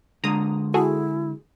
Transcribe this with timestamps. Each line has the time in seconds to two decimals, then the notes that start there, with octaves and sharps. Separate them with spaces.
0.24 D3 G#3 A#5 D#6
0.74 E4 F#4 G#4 A4